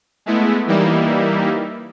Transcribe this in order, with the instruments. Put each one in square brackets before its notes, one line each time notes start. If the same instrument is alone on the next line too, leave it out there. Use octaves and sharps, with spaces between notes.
[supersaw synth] G#3 A3 B3 E4
E3 G3 A#3 D#4 E4